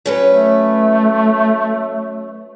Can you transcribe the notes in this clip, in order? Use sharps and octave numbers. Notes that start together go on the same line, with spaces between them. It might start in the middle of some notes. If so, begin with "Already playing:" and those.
F#3 C#4 B4
A3